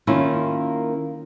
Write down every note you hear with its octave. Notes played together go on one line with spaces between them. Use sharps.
D#3 G3 A#3 C#4 E4 F4